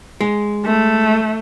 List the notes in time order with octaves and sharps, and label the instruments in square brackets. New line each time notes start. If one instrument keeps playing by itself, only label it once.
[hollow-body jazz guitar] G#3
[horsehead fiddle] A3